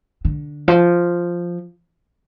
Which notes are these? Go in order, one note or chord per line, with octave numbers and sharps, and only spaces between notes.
D3
F3